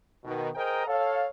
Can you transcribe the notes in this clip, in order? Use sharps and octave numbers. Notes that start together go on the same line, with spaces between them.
B2 D#3
G#4 A#4 C5 D#5 G5 A#5
A4 C#5 F5